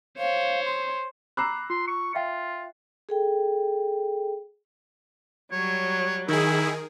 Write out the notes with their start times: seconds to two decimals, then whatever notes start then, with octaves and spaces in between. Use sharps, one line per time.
0.18 C5 C#5 F5
0.64 C6
1.37 A#5 B5 D6 E6 F#6 C7
1.70 F4 C6
1.87 C#6
2.15 F4 E5 F5 G5
3.09 G#4 A4 G5
5.52 F#3 G3 C#5
6.28 D#3 E4 G#4 A#4